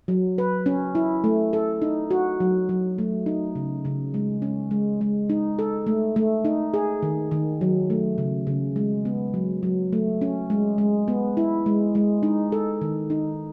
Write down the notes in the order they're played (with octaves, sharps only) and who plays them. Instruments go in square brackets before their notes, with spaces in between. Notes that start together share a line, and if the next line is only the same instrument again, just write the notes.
[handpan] F#3
B4
C#4
E4
A3
A4
D#4
F#4
F#3
F#3
A3
D#4
C#3
C#3
G#3
C#4
G#3
G#3
D#4
A4
A3
A3
D#4
G#4
D#3
D#3
F#3
A3
C#3
C#3
G#3
B3
F#3
F#3
A3
C#4
G#3
G#3
B3
E4
G#3
G#3
D#4
A4
D#3
D#4